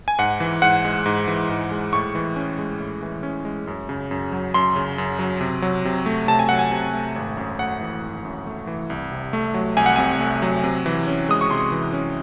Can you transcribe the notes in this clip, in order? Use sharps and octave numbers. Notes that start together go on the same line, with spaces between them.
G#5
G#2 F#5
E3
G#2 F#5
G#3
G#2
E3
G#2
G#3
A2 C#6
E3
C#4
G#3
A2
E3
C#4
G#3
F#2
C#3
F#2
F#3
F#2 C6
C#3
F#2
F#3
C3
F#3
C3
A3
C3 A5
G#5
F#3 F#5
G#5
C3
A3
G#1
F#2
A3 F#5
E3
G#1
F#2
A3
E3
C2
C3
A3
F#3
C2 G#5
F#5
C3 G#5
A3
F#3
C3
E3
C#4
G#3 D#6
C#6
C3 C6
E3
C#4